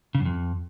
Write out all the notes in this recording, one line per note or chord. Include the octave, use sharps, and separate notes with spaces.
C#3
F#2
F2